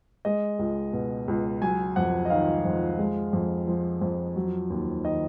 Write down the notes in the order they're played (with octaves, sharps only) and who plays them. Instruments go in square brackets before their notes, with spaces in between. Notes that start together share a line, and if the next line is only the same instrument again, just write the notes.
[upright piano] G#3 D#5
C#2
B2
C#2
F#3 G#5
F2 F#5
D#5
D#3 F5
F2
G#3
F2
F3
F2
F#3
D#2
D#3 D#5